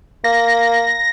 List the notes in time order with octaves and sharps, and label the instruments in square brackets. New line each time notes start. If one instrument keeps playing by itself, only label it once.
[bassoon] A#3 [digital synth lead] A#6